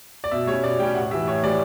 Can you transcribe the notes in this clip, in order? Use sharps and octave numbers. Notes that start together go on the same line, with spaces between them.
D5
B2 E5
G3 C#5
C#4
B2 D5
G3 C#4 G5
A2 F#5
E3 G3 E5
A2 C#5
E3 G3 D5